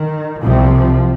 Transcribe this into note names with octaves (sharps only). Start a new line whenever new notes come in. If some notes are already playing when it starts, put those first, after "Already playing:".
Already playing: D#3
C2 C3 F3